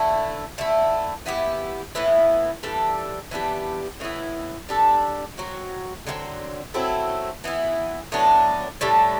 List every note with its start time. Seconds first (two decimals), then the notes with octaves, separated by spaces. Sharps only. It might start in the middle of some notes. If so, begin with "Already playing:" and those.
Already playing: D3 A3 E4
0.58 D3 A3 E4
1.26 E3 B3 E4 G4
1.95 A2 E3 B3 E4
2.63 E3 G3 D4 A4
3.31 E3 B3 D4 G4
4.00 A2 E3 B3 E4
4.69 G3 D4 A4
5.37 F#3 C4 F#4
6.07 D3 F#3 A3 C4
6.74 F#3 A3 C4 E4
7.44 E3 B3 E4
8.12 A2 F#3 B3 D4
8.81 A2 G3 D4 A4